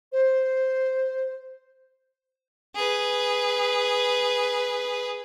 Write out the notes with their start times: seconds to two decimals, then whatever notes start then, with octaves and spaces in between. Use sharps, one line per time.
0.12 C5
2.75 G#4 B4